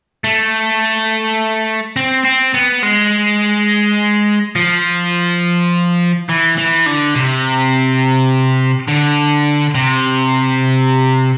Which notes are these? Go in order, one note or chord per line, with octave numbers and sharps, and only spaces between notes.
A3
C4
C4
B3
G#3
F3
E3
E3
D3
C3
D3
C3